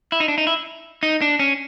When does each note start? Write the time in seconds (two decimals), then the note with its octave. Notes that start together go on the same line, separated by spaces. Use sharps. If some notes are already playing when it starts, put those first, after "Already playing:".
0.12 E4
0.20 D#4
0.28 D4
0.38 D#4
0.47 E4
1.03 D#4
1.22 D4
1.39 C#4